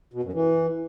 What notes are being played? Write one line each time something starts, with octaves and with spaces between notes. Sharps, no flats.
B2
F#2
E3